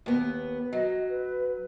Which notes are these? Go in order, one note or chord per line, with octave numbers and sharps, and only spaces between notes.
D#2 B3
F#3 D#5
B4